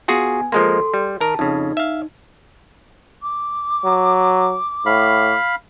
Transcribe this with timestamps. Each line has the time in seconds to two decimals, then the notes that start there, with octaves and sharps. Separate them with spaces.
0.08 B3 F4 F#4 G#4 G#5
0.52 F3 G#3 A#3 A4 C6
0.94 G3
1.20 D#3 A#4 A5
1.39 F2 C#3 D#4
1.77 E5 F5
3.22 D6
3.84 F#3
4.86 A2 F5 B5